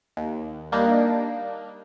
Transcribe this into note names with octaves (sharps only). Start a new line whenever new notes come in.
D#2
G3 A#3 D4 D#4